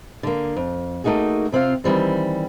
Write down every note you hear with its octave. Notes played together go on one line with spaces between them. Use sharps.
D3 A#3
F2
A3 A#3 D#4 F#4 G#4
C3 C4 F4 F5
D#3 E3 G3 C4